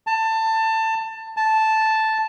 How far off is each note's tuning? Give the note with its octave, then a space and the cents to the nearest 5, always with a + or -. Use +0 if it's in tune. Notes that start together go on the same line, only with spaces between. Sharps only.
A5 +20
A5 -5